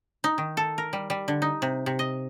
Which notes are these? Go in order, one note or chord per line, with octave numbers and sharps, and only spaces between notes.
D#4
D#3
A4
A#4
G3
G3
D3
D#4
C3
C3
D#5